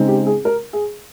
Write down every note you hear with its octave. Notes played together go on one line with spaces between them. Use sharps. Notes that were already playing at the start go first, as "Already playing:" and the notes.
Already playing: C#3 G#3 C4 D#4
G4
G#4
A#4
G#4